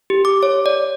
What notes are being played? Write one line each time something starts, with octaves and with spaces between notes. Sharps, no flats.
G4
D6
C#5
D5